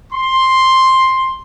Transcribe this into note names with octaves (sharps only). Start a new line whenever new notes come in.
C6